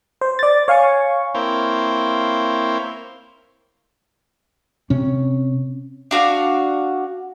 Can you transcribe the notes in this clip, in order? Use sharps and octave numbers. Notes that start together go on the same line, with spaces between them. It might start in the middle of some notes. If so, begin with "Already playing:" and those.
C5
D5 A6
C#5 F5 G#5 C#6
A#3 C4 E4 C5 C#5 F5
C3 C#4
D4 F#4 F5